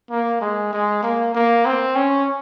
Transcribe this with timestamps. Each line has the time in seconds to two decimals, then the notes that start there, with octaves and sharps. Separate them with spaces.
0.10 A#3
0.41 G#3
0.73 G#3
1.03 A#3
1.35 A#3
1.66 C4
1.96 C#4